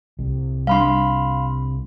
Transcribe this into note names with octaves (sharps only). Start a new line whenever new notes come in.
C2
G3 D4 F5 B5 C6